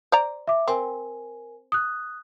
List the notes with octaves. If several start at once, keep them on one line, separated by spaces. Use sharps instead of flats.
C5 D5 A#5
E5 D6
C4 A#4 G#5
D#6 F#6